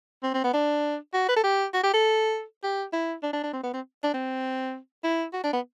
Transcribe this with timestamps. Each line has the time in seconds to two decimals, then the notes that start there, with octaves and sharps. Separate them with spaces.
0.23 C4
0.34 C4
0.44 B3
0.54 D4
1.13 F#4
1.28 B4
1.36 A4
1.44 G4
1.74 F#4
1.83 G4
1.94 A4
2.64 G4
2.93 E4
3.23 D4
3.33 D4
3.43 D4
3.53 C4
3.63 B3
3.73 C4
4.03 D4
4.14 C4
5.04 E4
5.33 F#4
5.43 D4
5.53 B3